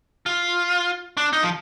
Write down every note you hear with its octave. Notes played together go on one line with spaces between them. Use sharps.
F4
D4
D#4
F3